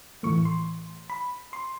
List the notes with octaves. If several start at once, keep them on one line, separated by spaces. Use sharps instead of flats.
A2 E3 A3 C#6
C6
B5
C6